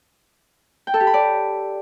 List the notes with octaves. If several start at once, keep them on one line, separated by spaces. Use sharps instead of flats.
G5
A4
G4
B5
D5